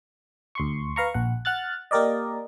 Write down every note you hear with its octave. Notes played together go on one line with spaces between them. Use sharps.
D2 C6 C#6
B4 F5 A#5 C#6
A#1 F#5
F#5 F6 F#6 A6
A#3 G4 A#4 D5 D#5